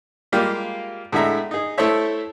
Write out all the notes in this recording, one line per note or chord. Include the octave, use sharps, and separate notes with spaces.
G3 G#3 A#3 F4 G4
A2 D3 G#3 G#4 E5 A#5
D#4 G#4
A3 E4 A4 C5 C#5 E5